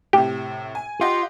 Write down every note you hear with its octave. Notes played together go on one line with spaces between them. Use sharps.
A2 C3 G4
G#5
F4 G4 D#5 F#5